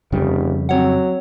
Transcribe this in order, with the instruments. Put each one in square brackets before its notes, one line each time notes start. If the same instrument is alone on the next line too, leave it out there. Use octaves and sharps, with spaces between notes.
[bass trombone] F1 [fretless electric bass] F2 C#3 G3
[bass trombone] F#3 [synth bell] C4 C#5 F#5